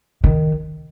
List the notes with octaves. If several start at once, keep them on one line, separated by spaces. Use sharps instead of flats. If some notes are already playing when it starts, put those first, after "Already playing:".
D#3